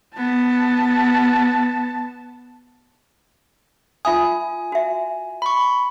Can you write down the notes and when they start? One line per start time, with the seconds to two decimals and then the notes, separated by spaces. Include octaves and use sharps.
0.17 B3 A5
4.05 F4 E5 G#5 D#6
4.72 F#4 E5
5.42 B5 C#6